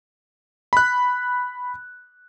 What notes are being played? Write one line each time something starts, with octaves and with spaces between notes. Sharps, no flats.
B5 F#6